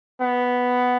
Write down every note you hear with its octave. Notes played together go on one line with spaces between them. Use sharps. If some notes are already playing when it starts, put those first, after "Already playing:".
B3